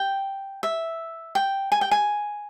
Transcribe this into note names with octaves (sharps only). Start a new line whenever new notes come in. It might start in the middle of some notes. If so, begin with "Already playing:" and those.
Already playing: G5
E5
G5
G#5
G5
G#5